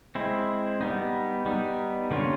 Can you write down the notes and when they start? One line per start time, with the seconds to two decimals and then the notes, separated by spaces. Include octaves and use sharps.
0.15 G#3 C4 E4
0.81 G3 B3 D#4
1.46 G3 B3 D#4
2.11 D3 G3 A#3 C#4 F4